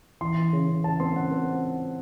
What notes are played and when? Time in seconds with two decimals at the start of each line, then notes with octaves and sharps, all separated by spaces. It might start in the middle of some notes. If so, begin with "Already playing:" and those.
0.21 E3 C6
0.37 E3
0.53 C#3
0.69 C#3
0.84 C#3 A5
1.00 C4 C6
1.16 C#3 F#5
1.32 C4